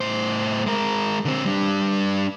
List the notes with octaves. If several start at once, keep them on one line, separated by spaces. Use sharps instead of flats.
A2 C5
G#3 A#4
D3 C4
G3 D4